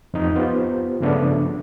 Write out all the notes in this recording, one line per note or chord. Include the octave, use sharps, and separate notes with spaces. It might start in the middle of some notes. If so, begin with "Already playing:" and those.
F2 D#4
B3 F4 G4 C5
G2 C#3 F3 A3 B3 D4